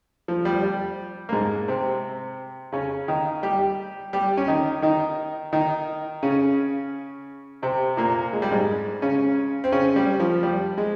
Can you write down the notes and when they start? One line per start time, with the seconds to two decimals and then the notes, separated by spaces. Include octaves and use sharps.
0.28 F3
0.45 G3
0.63 G3
1.29 A#3
1.33 G#2 G#3
1.68 C3 C4
2.72 C#3 C#4
3.08 D#3 D#4
3.43 G3 G4
4.13 G3 G4
4.37 C#4
4.48 D#3 D#4
4.82 D#3 D#4
5.53 D#3 D#4
6.23 C#3 C#4
7.62 C3 C4
7.97 A#2 A#3
8.33 G#3
8.42 G3
8.51 G#2 G#3
9.02 C#3 C#4
9.64 C4
9.72 C#3 C#4
9.96 G3
10.20 F3
10.43 G3
10.78 G#3